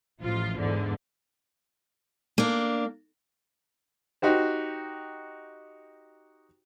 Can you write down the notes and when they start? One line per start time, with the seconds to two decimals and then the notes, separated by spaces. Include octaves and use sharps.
0.22 A1 F3 F4
0.59 E2 G#2 D3
2.38 A#3 D4
4.22 D#4 F#4 G4 C5